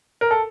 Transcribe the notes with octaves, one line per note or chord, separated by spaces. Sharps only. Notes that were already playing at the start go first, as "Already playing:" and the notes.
A#4
A4